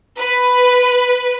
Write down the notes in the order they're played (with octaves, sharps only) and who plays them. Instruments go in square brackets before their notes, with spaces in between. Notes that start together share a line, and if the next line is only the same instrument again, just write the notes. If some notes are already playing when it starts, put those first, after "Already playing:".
[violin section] B4